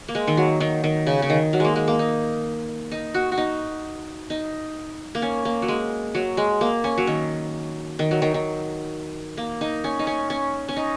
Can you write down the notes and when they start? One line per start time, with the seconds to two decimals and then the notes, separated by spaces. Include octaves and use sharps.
0.08 A#3
0.15 G#3
0.27 D#3
0.37 F#3
0.60 D#3
0.84 D#3
1.07 C#3
1.22 C#3
1.30 D#3
1.53 F#3
1.60 G#3 A#3
1.76 G#3
1.88 A#3
1.99 D#4
2.92 D#4
3.14 F#4
3.32 F#4
3.38 D#4
4.30 D#4
5.15 A#3
5.22 C#4
5.45 A#3
5.62 F#3
5.68 G#3
6.15 F#3
6.37 G#3
6.61 A#3
6.84 C#4
6.98 F#3
7.07 D#3
7.99 D#3
8.11 F#3
8.22 D#3
8.34 D#3
9.37 A#3
9.61 D#4
9.84 C#4
9.99 D#4
10.07 C#4
10.30 C#4
10.69 C#4
10.76 D#4